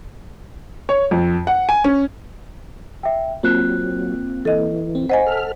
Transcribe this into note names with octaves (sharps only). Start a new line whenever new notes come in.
C#5
F2
F#5
G#5
C#4
E5 G5
F#3 A#3 C4 F4 F#6
E3 A4 D#5
C4
C5 D#5 F#5 G#5 B6
A4 F6